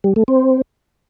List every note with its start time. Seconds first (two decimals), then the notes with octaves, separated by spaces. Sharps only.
0.04 G3
0.16 A3
0.28 C4